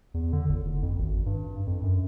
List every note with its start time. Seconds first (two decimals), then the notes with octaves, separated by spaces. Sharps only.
0.14 E2
0.33 D3
0.49 G1
0.65 F#1
0.82 F2
0.99 G#1
1.26 G2
1.67 F2
1.83 F#2